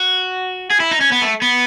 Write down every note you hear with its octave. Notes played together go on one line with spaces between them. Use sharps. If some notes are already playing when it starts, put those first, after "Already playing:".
Already playing: F#4
G#4
E4
D#4
C#4
B3
A3
B3